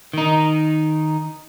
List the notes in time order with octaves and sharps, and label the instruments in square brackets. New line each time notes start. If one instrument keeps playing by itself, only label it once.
[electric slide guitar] D#3 D#4